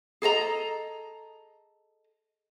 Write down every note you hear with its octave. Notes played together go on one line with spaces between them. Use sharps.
G#4 A4 D#5 A#5